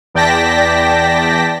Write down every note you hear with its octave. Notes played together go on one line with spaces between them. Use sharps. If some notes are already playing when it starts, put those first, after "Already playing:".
E2 D5 G5 A5 A#6 B6